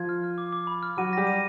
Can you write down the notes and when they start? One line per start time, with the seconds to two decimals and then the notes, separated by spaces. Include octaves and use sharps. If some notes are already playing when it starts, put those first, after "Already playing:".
Already playing: F3 F4 G#6
0.09 F6
0.24 F6
0.38 D6
0.53 D6
0.67 B5
0.83 F6
0.97 F#3 F#4 D#7
1.13 G3 G4 A#6
1.27 D#7